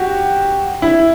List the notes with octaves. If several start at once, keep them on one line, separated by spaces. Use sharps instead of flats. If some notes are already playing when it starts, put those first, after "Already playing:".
Already playing: F#4 G4
E4